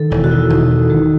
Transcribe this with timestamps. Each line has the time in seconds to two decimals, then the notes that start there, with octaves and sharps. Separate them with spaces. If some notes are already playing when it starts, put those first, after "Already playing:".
Already playing: D#3 A4
0.11 E1 E4
0.24 F#4
0.31 D#3 E4
0.50 E1 D#4
0.70 D#3
0.89 D#3